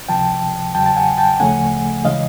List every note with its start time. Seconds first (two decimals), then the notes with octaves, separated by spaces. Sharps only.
0.09 C#2 C3 F3 G5 A5
0.75 E2 C#3 F#3 G5 A5
0.86 A5
0.96 F#5 G#5
1.18 G5 A5
1.40 D2 C#3 F3 A3 C#4 F#5 G#5
2.05 C#3 E3 G#3 D#5 F5